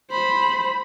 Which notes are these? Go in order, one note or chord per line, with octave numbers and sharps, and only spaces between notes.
C5 B5